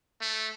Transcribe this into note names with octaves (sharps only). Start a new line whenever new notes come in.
A3